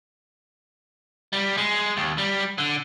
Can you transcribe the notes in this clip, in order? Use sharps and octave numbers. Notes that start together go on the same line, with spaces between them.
G3
G#3
D#2
G3
D3